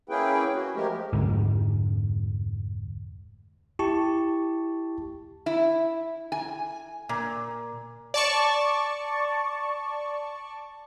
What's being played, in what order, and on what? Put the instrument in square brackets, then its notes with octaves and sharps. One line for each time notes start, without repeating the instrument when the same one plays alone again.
[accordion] A#3 C#4 E4 G#4 B4 G5
F#4
F3 G#3 A3 G4 A#4
[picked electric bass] F1 D2 G#2
[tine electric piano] E4 G4 A5 C#6
[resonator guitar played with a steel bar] E4
G#5
A#2
[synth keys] D5 A5 C#6